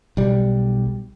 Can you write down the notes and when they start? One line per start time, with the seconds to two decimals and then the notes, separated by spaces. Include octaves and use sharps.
0.17 B1 G3